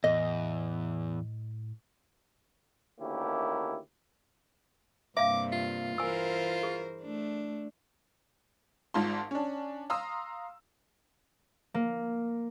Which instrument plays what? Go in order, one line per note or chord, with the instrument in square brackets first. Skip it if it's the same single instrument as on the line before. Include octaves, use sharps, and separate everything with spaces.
[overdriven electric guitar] E2 [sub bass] A2 [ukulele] D#5
[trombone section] D2 D#3 A#3 C#4 E4 G4
[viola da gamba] G2 C3 A#3 [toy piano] E5 F5 [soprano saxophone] D6
[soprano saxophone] F4
[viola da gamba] E3 A#4 C5 [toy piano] G#5 E6
[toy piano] G#4
[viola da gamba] A3 D4
[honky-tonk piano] G#1 G#2 F4 A5 C6
C#4 D4
F5 A#5 C6 D#6 E6
[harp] A#3